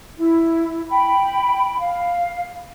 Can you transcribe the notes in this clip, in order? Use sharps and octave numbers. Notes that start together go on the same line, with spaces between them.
E4
G5 B5
F5